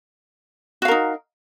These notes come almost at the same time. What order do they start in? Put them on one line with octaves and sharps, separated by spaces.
F#4 F5 A#4 D#4